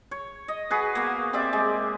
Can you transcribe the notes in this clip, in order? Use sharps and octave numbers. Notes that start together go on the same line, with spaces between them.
C#5
D#5
F#4 G#4 B4
A#3 B3
C4 G4 D5 E5
G#3 G4